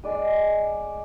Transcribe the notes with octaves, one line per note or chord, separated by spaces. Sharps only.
G#3 D5 D#6